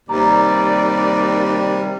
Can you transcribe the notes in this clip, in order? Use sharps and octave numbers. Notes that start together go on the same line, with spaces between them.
D#2 C3 G3 D5 A#5